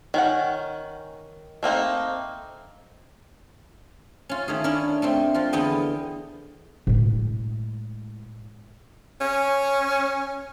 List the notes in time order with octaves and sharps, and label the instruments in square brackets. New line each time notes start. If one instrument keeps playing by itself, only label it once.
[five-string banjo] D#3 C#4 F#5
A3 A#3 C4 D#4
[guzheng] C#4 F4
D#3 A3 C#4 G#4
C#4 D4 E4 A#4
A3 A#3 C4
F3 F4
E2 D3 B3 D#5 G5
[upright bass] A2 G#3
[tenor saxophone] C#4